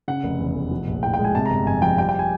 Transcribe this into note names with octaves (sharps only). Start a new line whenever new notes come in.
C#3 F#5
F1
E2
F1
F3
A#1
A2 G5
G5
G#3
G#5
C3 A5
A#5
G1
F2 G#5
F3 G5
G3 G5
G5
G#5